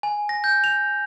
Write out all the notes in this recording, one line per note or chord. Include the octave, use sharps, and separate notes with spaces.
G#5
A#6
G6
F7